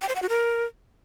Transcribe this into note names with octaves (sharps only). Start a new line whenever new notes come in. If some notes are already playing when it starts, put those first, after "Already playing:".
G5
C5
F#5
F#4
A#4